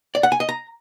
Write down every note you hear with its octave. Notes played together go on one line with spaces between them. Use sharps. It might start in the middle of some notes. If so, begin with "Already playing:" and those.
D5
F#5
G#5
D#5
A#5